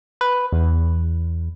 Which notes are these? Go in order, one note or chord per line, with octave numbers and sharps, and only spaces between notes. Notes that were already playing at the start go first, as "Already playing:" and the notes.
B4
E2